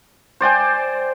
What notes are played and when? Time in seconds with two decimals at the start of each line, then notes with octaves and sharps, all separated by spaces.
0.41 C5 D5 G5 G#5